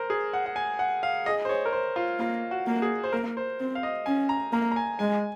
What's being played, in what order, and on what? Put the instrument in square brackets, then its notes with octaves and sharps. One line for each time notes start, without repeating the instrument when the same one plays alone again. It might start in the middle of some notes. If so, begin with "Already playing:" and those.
Already playing: [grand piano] A#4 C5
G#4
F#5
F#5
G#5
F#5
F5
[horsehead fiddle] G#4 [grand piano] D#5
[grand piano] C5
C#5
A#4
C5
F4
[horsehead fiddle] A#3 [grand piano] F4
[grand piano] F#4
[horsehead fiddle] A#3
[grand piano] G#4
C5
[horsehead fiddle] A#3 [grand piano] A#4
[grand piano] C5
[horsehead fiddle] C4
[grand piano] F5
D#5
[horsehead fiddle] C#4 [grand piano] G#5
[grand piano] A#5
[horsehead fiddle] A#3 [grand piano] A#5
[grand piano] A#5
G#5
[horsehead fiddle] G#3 [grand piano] G#5